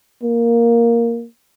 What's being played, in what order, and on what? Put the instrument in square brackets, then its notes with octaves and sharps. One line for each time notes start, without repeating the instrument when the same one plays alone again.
[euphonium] A#3